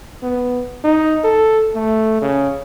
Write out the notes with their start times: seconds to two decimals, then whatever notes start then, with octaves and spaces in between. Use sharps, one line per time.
0.23 B3
0.84 D#4
1.24 A4
1.75 A3
2.22 C#3